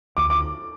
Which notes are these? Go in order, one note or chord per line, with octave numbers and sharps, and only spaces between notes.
D2 D6
D6